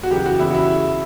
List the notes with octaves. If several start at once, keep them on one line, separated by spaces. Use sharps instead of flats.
F#4
F#2 C#3 E3 G4
F#4
E2 C#3 E3 E4
F#4
E4